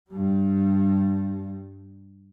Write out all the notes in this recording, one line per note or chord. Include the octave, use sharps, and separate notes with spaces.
G2 G3